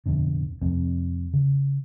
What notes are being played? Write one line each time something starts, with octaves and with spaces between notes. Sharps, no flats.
D1 F2 B2 D3
F2 C3 F3 C4
C#3